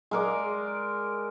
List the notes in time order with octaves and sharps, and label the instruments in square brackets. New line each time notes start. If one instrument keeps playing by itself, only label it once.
[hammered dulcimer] G#3 A#4 D5